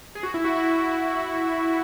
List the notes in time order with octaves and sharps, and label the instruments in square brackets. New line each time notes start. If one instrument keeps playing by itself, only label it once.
[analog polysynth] G#4
F#4
E4
F#4
E4
F#4